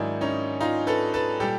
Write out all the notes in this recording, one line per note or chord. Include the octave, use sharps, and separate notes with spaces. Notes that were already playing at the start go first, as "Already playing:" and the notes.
Already playing: G#2 D#3 F#3 D4 E4
C#4 D#4
D#4 F4
A4 B4
A4 B4
A#2 G3 G4 A4